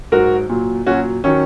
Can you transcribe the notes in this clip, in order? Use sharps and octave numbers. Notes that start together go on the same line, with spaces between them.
G#2 F#3 F#4 A#4
A#2 F#3
A#2 F#3 C#4 F#4
D#3 F#3 C#4